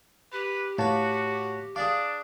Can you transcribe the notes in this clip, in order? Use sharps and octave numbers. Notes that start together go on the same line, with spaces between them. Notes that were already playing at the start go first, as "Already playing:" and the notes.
G4 B4
A2 F#4 B4 C#5 F5 A5
D4 G#4 D5 F5 D6